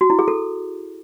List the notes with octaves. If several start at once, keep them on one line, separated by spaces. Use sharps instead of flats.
F#4
E4
G#4
A4